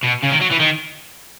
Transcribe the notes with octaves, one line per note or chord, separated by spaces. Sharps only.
B2
C#3
D#3
F#3
E3
D#3